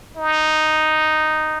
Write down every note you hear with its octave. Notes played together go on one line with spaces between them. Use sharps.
D#4